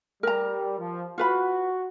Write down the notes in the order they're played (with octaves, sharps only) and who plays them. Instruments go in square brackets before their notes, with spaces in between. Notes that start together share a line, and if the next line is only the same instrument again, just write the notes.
[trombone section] G3 [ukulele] A#4 A#5
[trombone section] F3
[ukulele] F4 B4 B5 [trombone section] F#4